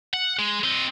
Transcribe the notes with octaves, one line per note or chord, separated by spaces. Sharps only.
F#5
G#3
C4 D#5